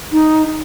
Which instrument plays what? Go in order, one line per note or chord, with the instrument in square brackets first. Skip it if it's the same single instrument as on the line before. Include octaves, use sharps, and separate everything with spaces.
[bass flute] D#4